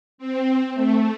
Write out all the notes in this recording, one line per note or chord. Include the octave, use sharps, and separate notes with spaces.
C4
A3